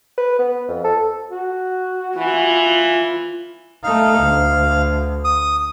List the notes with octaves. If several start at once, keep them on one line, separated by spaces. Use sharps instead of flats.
B4
B3
F2
A4
F#4
E3 F4
A3 D#4 F5
D2
D#6